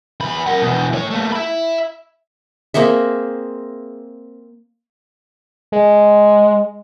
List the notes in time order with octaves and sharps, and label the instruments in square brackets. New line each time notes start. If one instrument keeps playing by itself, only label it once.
[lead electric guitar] E2 B5
A#4 F#5
B2 E3
A3 C#5
A3 A#3
E5 B5
[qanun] A#3 C4 G#4 E5
[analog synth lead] G#3